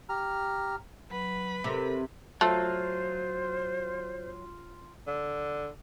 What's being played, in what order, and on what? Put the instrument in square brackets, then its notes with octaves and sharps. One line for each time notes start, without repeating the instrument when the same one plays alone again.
[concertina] G4 A#5 F6
[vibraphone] F#3 [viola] B4 B5
[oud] C3 [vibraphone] G4 A4 A#4
[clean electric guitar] F#3 [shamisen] A3 [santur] F4 [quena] C5
[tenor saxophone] D3